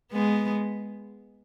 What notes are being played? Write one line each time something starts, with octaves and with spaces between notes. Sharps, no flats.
G#3 B3